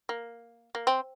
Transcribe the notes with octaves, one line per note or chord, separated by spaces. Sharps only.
A#3
A#3
C4